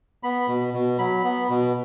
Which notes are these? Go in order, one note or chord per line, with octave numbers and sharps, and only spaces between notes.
B3 B5
B2
B2
F#3 B5
B3
B2